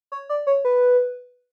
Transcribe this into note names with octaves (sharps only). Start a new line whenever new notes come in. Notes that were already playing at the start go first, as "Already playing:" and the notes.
C#5
D5
C#5
B4